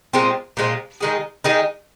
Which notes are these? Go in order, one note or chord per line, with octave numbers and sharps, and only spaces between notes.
A#2 G#3 C4 F4
A#2 G#3 C4 F4
D#3 G#3 D#4 G#4
D#3 G#3 D#4 G#4